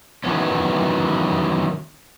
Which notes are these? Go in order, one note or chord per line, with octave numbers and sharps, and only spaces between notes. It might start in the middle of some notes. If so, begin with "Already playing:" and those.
D#3 E3 F#3 B3 C#4